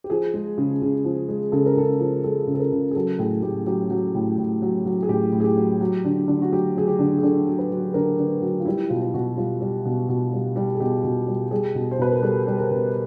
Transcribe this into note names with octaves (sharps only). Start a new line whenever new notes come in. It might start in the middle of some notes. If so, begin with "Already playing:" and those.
G4
F3 G#4
G#3
C#3
C#3
F3
G#3
C#3 A4
A#4
C#3 A4
F3
G#3 A4
C#3
A4
A#4
C#3
G#4
F#3 A4
A2 G#4
A2 G4
F#3 G4
F#3
A2
A2
F#3
F#3
G#4
A2 G4
A2
G#4
G4
F#3
F#3
D3
D3
F#4
F#3 G4
F#3 G#4
G4
D3
G#4
D3 A4
F#3
B4
F#3
D3 A#4
D3
F#3
F4
G3 E4
B2 F4
F4
B2 F#4
G3 F4
G3
B2
B2
G3
G3
G#4
B2 G4
B2
G3
G3 G#4
B2
C5
B2 B4
A#4
G3 A4
G3
A#4
B2